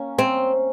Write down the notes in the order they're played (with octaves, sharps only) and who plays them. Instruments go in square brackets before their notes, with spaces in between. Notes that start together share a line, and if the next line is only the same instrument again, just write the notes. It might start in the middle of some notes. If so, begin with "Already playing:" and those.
Already playing: [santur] A#3 C#4
[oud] C4